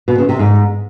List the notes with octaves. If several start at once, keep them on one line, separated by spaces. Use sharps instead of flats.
B2
C#3
C3
G#2